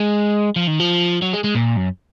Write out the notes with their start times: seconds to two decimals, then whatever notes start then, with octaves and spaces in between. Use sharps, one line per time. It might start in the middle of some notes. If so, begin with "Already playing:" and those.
Already playing: G#3
0.56 F3
0.67 D#3
0.80 F3
1.22 F#3
1.33 G#3
1.44 G#3
1.55 A#2
1.77 F#2